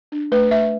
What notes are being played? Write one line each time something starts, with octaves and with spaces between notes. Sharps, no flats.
D4
A3 B4
A3 E5